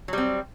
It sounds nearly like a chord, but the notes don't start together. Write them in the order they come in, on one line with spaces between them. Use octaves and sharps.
F#3 G3 C4